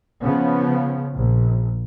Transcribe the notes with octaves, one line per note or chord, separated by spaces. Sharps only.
C#3 F3 B3
A#1